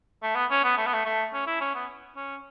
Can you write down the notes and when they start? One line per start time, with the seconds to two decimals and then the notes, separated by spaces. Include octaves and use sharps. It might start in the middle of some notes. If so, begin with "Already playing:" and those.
0.22 A3
0.35 B3
0.50 C#4
0.63 B3
0.77 A3
0.86 B3
0.93 A3
1.05 A3
1.33 C#4
1.47 E4
1.60 C#4
1.75 B3
2.16 C#4